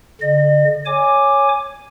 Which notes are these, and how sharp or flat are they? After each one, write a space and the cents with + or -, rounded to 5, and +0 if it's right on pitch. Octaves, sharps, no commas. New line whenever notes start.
D3 -30 D#5 -45
C#5 +0 G#5 +0 D6 +5